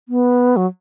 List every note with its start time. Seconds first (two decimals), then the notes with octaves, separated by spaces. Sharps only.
0.09 B3
0.56 F#3